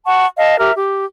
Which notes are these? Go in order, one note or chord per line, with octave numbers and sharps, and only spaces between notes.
F#5 A5 C#6
D#5 F5 A5
G4 A#4 E5
G4